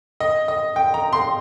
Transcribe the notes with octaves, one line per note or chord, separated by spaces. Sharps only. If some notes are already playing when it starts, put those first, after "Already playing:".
D#5
D#5
G5
A#5
C6